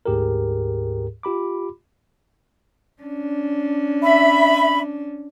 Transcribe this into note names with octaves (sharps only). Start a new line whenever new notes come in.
D2 G#2 G4 G#4 A#4
F4 G4 B5 D6
C#4 D4
E5 B5